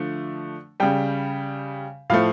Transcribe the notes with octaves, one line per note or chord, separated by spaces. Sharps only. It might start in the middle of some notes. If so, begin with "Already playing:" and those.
Already playing: D3 F3 A3
C#3 G3 G5
A2 F3 A3 F5